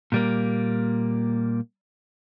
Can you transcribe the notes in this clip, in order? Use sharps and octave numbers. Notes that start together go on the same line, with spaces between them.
A#2 G3 A#3